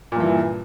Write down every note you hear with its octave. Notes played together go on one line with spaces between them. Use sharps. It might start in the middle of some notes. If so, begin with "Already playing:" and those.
G2 A#2 E3